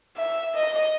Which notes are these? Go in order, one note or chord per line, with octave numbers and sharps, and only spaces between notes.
E5
D#5